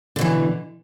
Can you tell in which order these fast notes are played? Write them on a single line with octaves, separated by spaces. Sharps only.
D3 B2 E3